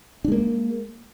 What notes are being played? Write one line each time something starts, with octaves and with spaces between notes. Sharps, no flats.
G#3 A#3 D4